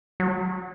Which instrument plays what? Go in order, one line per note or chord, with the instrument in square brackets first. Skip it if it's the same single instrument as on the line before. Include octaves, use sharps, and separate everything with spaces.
[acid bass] F#3